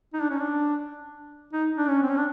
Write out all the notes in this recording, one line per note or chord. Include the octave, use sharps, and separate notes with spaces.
D#4
D4
C#4
D4
D#4
D4
C#4
C4
C#4
D4